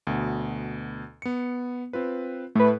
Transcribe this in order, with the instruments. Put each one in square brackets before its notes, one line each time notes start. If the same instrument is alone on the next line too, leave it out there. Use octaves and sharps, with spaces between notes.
[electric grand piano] D2 B2
B3 C#7
C4 F4 B4
[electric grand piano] A2 [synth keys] A3 B4